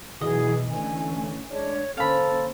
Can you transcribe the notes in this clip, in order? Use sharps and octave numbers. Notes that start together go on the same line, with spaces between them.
B2 D#3 E3 F#3 E4 F#4 G#4 D#5
D3 E3 A3 C#4 G#5
G#3 D4 C#5
D3 A#3 C#4 A4 C5 F5 B5